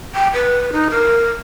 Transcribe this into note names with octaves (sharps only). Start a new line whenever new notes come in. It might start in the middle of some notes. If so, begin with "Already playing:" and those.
G5
B4
D#4
A#4